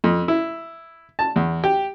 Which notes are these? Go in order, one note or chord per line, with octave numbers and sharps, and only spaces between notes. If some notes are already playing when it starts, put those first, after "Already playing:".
F2
E4
A5
E2
G4